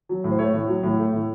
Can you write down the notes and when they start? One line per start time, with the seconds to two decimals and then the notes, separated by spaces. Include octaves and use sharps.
0.09 F#3
0.24 A2
0.31 C5
0.39 A3 C#5
0.54 A2
0.68 F#3
0.83 A2
0.99 A3
1.13 A2